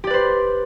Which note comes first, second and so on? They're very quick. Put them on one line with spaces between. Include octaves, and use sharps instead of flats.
G4 D5 B4 C5